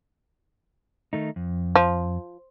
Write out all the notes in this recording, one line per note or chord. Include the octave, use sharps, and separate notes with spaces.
D#3 A3 D#4
F2
F3